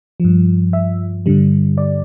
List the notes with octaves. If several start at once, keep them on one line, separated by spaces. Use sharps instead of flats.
G2 F3
E5
G2 D3 G3
D5